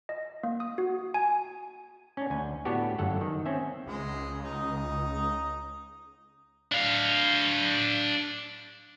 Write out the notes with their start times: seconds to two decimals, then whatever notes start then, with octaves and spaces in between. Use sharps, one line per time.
0.09 D#5
0.43 A#3
0.60 D#6
0.78 F#4
1.14 G#5
2.17 C#4 D4
2.30 D2 G#5
2.65 A2 B3 D4 F#4 G4
2.98 G1 F#2 A4 F#5
3.21 D#3
3.46 C4 C#4 E5
3.86 C#2 G#3
4.42 D#4 D#6
6.72 D4 F5